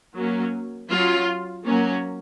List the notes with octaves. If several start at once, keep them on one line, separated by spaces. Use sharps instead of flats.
F#3 A#3 C#4
F#3 C#4 F4
F#3 A#3 C#4